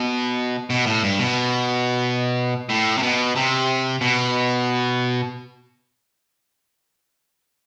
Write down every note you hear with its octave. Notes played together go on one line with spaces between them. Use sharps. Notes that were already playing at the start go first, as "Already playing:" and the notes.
Already playing: B2
B2
A2
G2
B2
A2
C3
B2
C3
B2